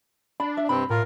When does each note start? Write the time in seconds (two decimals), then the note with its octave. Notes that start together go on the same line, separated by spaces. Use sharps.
0.40 D4 B5
0.57 E5
0.69 G2 C3 C4 B5
0.90 A2 F4 A#4